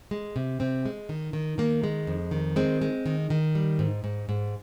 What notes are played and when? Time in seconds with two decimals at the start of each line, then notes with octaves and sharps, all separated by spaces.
0.11 G#3
0.36 C3
0.60 C3 C4
0.85 G#3
1.09 D#3
1.33 D#3
1.58 D#3 A#3
1.84 G#3
2.07 F2
2.31 D#3
2.56 G#3 C4
2.82 G#3
3.06 D#3
3.30 D#3
3.55 G3
3.79 G#2
4.04 G#2
4.29 G#2